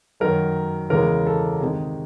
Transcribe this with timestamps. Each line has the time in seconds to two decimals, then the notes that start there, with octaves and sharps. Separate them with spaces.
0.20 F#2 D#3 F#3 A#4
0.90 E2 C#3 E3 G#3 A#4
1.27 A4
1.61 C3 D#3 G#3 G#4